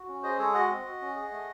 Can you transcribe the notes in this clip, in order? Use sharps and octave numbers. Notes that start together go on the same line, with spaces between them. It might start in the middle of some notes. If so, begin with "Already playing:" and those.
Already playing: F#4
C#4
G#4 C5 D#5
G#3 A4 C#5
F#4 D#5 F#5
C4
F#4
C#4
G#4
A3